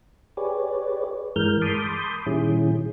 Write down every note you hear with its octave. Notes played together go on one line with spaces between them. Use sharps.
G4 G#4 B4 C#5 D5
G2 E3 G#3 A#4 F6 G6
A5 B5 C6 D6 D#6 G6
A#2 D#3 G3 C#4 E4 G#4